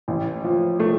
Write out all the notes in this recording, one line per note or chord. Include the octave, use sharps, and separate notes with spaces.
A1
F3
A3